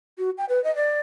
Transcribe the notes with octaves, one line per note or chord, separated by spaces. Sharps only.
F#4
G5
B4
D#5
D5